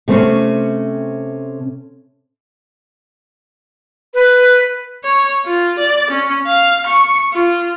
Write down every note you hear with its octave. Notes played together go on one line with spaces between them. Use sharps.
C3 A3 C4 C#4
B4
C#5
F4
D5
C#4
F5
C#6
F4